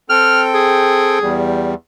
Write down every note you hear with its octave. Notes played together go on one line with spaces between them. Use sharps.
C4 A4 G5 F6
G#4
E2 G3